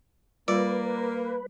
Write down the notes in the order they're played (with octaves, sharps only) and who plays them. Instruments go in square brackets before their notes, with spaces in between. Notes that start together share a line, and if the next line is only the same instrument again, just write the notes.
[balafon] G3 F4 [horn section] A#3 [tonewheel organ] B4 [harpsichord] D5